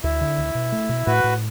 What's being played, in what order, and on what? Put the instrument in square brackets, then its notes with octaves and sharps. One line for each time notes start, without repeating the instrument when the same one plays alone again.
[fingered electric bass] D2 [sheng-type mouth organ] E4
[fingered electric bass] D3
D2
B2
A3
B2
[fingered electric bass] A2 [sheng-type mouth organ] F#4 B4
[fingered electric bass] A2